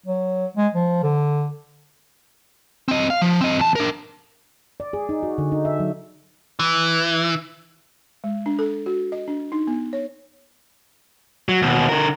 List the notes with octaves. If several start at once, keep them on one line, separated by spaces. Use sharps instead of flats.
F#3
G#3
F3
D3
C4 D#5
F5
F3
C4 D#5
E2 A5
D4 A#4
D5
G#4
D#4
F#4
D3
D#4
E5
F#3
E3
G#3
D4
A4
F#4
D#5
D4
D#4
B3
C#5
F#3
D#2 B2
D3 A#4